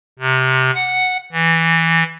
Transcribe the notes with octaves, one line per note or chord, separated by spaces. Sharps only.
C3
F#5
E3